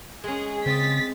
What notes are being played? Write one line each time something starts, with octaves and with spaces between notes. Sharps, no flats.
G#3 C#4 G#4
C#3 C4 D#5 A6 B6